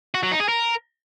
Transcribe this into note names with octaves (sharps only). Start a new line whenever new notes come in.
F#4
F#3
D#4
G#4
A#4